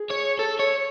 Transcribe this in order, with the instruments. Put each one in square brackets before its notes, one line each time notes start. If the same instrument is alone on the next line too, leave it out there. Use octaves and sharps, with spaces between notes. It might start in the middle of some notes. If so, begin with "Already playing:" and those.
Already playing: [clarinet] G#4
[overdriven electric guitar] C#5
A4
C#5